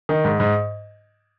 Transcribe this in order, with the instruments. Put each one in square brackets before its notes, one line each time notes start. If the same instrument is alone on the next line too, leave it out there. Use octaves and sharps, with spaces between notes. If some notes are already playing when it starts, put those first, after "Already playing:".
[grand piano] D#3
G#2
G#2